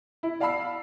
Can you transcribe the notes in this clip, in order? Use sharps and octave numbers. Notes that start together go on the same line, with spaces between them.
E4
D5 F5 A5 B5 E6 C7